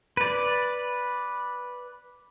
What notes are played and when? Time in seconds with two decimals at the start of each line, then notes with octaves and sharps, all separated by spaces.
0.17 B4 D5